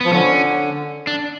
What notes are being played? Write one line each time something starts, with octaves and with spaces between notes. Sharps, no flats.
F3 B3
D3 C#4
D4